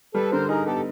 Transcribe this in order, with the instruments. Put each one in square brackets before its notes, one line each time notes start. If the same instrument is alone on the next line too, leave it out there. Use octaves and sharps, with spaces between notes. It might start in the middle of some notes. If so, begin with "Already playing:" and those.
[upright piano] G3 [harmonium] A4 B4
[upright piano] D3 [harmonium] A#4 C5
[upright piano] D#4 [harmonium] G#4 A#4
[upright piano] B3 [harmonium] G4 A4